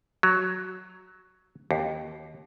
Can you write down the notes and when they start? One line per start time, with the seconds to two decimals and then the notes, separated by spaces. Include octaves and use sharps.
0.23 F#3
1.71 D#2